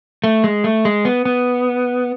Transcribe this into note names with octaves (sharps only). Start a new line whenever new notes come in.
A3
G#3
A3
G#3
B3
B3